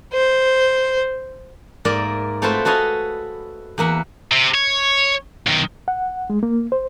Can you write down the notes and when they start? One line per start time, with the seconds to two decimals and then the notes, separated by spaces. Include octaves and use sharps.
0.13 C5
1.85 G#2 A#3 A#4 D5 E5
2.42 A3 C4 F4 F#4 B4 C5
2.65 F#4 A4 B4 D#5 F5 G#5
3.78 E2 A#3 E5 F#5
4.32 C3
4.55 C#5
5.47 B1 D#3
5.88 F#5
6.30 G#3
6.43 A#3
6.72 C5